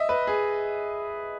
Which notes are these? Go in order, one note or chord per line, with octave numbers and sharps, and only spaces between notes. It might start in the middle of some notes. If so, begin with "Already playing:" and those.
Already playing: D#5 E5
B4
G#4